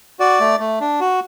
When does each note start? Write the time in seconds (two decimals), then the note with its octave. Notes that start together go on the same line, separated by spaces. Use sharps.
0.19 F#4 D5
0.40 A3
0.59 A3
0.81 D4
1.00 F#4